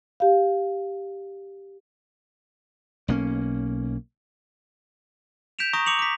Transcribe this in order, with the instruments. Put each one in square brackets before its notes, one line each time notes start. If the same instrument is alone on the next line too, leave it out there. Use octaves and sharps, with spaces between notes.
[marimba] G4 F5
[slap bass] B1 A#3 C#4
[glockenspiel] G6 B6 D7 E7 F7
A#5 C#6 D#6 A#6
D6 C#7 F7 F#7
D6 B6